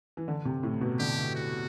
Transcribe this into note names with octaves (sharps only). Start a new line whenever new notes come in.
E3
D3
C3
A2
B2
D3 G4
F#4